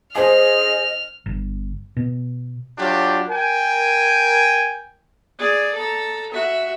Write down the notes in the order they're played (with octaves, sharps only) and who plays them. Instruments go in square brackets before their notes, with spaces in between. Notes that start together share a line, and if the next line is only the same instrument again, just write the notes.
[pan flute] G#4 [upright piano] C5 G#5 [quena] D#5 [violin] F6
[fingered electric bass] G1
B2
[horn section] F#3 D4 F4 G4
A#4 G5 G#5
[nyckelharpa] G#4 D5
A4 A#5
F#4 E5